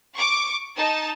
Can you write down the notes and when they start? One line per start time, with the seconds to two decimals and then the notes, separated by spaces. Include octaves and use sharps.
0.15 C#6 D6
0.77 D#4 A5